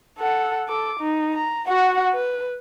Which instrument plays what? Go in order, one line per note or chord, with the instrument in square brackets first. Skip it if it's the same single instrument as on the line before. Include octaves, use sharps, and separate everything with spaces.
[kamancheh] A4 F#5
A4 D6
D#4
A#5
F#4 F#5
B4